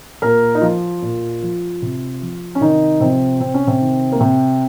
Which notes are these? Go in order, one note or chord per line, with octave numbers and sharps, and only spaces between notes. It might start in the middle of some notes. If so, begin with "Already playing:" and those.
A#2 A#3 A#4
D#4
F3 F4
A#2
F3
C3
F3
C#4
C3 D#3 D#4
C3 F3 C4
C3 C4
C#4
C3 C4
D#3
A#3
C3 C4